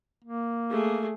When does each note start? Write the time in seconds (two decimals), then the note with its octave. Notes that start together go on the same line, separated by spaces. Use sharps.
0.24 A#3
0.71 A3 G#4